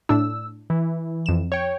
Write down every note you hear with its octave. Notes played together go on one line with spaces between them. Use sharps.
A2 D4 E6
E3
F2 E7
C#5 G5